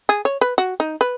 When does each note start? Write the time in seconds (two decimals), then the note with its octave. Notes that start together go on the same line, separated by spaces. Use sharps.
0.09 G#4
0.25 C#5
0.41 B4
0.58 F#4
0.80 D#4
1.01 B4